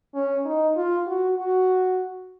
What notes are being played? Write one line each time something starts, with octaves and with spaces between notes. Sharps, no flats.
C#4
D#4
F4
F#4
F#4